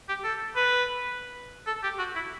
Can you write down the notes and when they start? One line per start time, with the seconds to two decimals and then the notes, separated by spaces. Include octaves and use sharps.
0.09 G4
0.24 A4
0.56 B4
1.67 A4
1.83 G4
1.99 F#4
2.15 E4